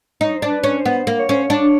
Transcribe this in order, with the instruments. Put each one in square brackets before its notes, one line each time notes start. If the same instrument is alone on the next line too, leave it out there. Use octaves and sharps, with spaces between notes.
[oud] D#4 [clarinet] C#5
[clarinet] C5
[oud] D4
[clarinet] B4
[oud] C#4
[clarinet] C5
[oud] B3
A#3
[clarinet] C#5
[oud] C#4 [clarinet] C5
[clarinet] C#5
[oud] D4